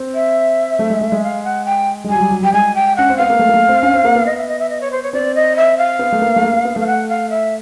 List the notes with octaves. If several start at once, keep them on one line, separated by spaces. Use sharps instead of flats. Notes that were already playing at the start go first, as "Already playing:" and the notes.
Already playing: C4
E5
A3
G#3
A3
G#3
F5
F#5
G5
G#3
G3 G#5
F#3
G3
F#3
G3 G5
G#3 G#5
G5
C#4 F#5
C4
B3 F5
A#3
A3
A#3
A3
C4
C#4
C4
A#3
B3
D#5
E5
D#5
E5
D#5
C#5
C5
C#5
C4 D5
D#5
E5
F5
B3
A3
A#3
A3
A#3
A#3
B3
A3 F5
F#5
F5
E5